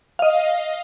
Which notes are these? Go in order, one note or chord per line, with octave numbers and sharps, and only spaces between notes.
D#5 F5